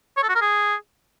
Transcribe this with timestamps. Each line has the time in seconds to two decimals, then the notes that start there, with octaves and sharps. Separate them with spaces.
0.17 C#5
0.23 A4
0.29 F#4
0.35 A#4
0.41 G#4